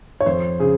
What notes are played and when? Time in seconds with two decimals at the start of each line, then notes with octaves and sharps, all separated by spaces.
0.20 C#5
0.26 F2 C5
0.59 C#3 G#4